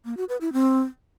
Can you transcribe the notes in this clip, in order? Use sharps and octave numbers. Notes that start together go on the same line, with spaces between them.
A#3
F#4
B4
E4
C4